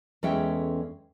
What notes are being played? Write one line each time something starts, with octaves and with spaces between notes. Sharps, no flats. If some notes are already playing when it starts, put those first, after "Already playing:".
E2 G#3 C#4 A4 E5 G5